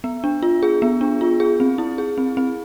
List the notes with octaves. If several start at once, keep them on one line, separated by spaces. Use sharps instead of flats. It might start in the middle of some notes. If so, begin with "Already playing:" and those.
B3
D4
F4
G#4
B3
D4
F4
G#4
C4
E4
G#4
C4
C4